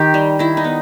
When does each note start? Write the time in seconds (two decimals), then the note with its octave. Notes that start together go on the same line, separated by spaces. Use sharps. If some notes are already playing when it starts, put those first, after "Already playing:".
Already playing: D#3 G4
0.14 G3
0.39 D#3 E4
0.57 D#4
0.64 B3